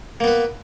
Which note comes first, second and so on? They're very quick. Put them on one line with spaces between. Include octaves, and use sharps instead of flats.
A#3 B3 B4